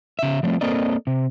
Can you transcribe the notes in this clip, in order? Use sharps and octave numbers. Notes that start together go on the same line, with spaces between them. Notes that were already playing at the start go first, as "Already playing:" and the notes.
C#3 E5
F3 G3 A3 C4
A#3 C4 A4 A#4 D5 D#5
C3